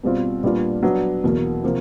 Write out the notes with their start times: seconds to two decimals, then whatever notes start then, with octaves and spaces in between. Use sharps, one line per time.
0.03 B2 G3 C4 F4
0.43 A#2 G3 B3 D4 F4
0.83 F#3 B3 D4
1.24 E2 B2 F#3 A#3
1.64 C3 F3 A#3